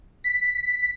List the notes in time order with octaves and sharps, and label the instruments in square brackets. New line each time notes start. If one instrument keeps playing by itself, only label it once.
[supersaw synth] B6